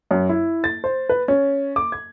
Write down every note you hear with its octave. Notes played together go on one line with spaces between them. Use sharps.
F#2
E4
A6
C5
B4
C#4
D6
G#6